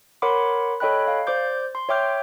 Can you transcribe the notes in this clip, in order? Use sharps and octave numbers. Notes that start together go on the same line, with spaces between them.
A#4 C#5 F#5 B5 C6 D6
A4 C#5 D#5 G5 B5 F#6
F5
C5 D5 D6 G6
C6
C#5 E5 G5 D6 F6 G6